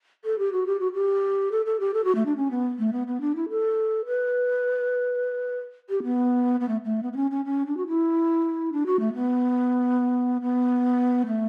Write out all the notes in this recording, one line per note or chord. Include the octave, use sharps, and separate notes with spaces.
A4
G4
F#4
G4
F#4
G4
A4
A4
G4
A4
F#4
A3
D4
C#4
B3
A3
B3
B3
D4
E4
A4
B4
G4
B3
B3
A3
A3
B3
B3
C#4
C#4
C#4
D4
F#4
E4
D4
F#4
A3
B3
B3
A3